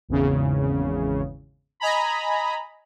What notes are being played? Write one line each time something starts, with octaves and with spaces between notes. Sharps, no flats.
G#1 E2 C#3
D#5 G#5 A#5 B5